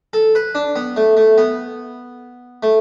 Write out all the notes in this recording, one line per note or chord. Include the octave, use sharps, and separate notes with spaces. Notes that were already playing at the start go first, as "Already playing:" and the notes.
A4
B4
D4
B3
A3
A3
B3
A3